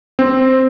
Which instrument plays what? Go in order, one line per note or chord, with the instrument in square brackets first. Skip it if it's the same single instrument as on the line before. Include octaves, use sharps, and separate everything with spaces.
[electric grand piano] C4